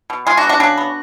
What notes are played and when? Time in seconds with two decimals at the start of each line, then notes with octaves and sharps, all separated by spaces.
0.10 B2
0.27 G#3 F4 G#4
0.37 D4 F#4
0.44 B3
0.49 D4 F#4
0.60 C#3 D4 F#4
0.78 B3